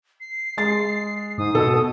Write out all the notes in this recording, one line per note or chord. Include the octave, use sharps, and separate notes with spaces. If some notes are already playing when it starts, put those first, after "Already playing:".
C7
G#3 A6
G#2 D#6
B2 A4